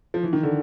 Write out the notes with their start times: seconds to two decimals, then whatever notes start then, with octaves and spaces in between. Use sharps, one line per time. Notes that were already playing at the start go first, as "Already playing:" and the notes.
0.14 F3
0.23 E3
0.33 D#3
0.43 D3